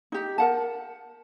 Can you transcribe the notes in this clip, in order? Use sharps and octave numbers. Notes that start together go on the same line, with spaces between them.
D#4 G4
A#4 F#5 A5